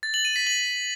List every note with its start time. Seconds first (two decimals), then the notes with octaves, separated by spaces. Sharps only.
0.03 A6
0.14 F#7
0.25 D#7
0.36 B6
0.47 F#7